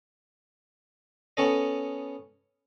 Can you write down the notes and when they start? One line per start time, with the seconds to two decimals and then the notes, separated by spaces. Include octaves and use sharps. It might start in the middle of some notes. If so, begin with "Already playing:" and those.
1.37 B3 C#4 A4 D#5